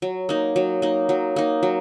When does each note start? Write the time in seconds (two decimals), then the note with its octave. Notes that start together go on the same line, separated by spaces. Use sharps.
0.02 F#3
0.29 A#3 D#4
0.56 F#3
0.82 A#3 D#4
1.09 F#3
1.36 A#3 D#4
1.63 F#3